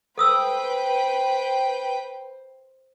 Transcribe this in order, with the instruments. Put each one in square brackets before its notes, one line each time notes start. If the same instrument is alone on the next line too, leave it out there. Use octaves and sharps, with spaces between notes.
[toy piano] A4 D#6 E6 [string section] B4 G5 [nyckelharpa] C5